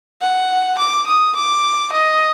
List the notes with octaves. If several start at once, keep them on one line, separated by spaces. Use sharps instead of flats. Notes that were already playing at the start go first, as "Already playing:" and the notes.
F#5
D6
D#6
D6
D#5